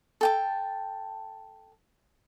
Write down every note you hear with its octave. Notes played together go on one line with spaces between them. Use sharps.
A4 G5 A5